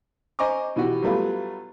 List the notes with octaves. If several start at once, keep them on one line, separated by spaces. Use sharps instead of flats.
C5 D#5 G#5 A#5 C#6 D6
B2 E3 F#4 G4
F#3 G3 A3 B3 F4